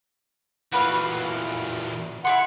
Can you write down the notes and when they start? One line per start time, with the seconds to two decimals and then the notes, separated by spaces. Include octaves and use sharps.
0.72 A#2 E3 F#4 B4 F5
2.25 E4 G#4 F#5 C6